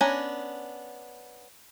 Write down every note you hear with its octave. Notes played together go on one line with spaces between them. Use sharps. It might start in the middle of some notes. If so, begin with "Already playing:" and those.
B3 C#4 D4 G#5 A#5